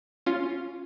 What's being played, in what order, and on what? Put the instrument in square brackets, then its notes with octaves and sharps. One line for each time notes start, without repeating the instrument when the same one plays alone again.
[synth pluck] C#4 F4